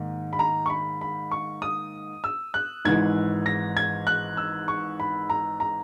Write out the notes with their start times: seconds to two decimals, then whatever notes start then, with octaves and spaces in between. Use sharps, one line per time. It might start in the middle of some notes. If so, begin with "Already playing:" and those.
Already playing: G#2 D#3 A#3
0.33 B5
0.39 A#5
0.66 C#6
0.70 B5
1.01 B5
1.31 C#6
1.62 D#6
2.24 E6
2.54 F#6
2.85 G#1 G#2 E3 G#6
3.46 A#6
3.77 G#6
4.07 F#6
4.37 E6
4.68 C#6
5.00 B5
5.30 A#5
5.60 A#5